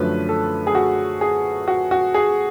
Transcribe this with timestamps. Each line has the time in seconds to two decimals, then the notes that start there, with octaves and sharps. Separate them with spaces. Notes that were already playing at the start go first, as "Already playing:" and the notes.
Already playing: F#2 D3 F3 A3 C#4 B4
0.29 A4
0.67 G#4
0.75 F#4
1.21 G#4
1.68 F#4
1.91 F#4
2.14 G#4